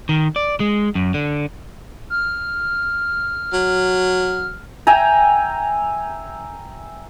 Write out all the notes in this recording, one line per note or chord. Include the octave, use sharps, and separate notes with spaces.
D#3
D5
G#3
F#2
D3
F6
F#3
E5 G5 G#5 A#5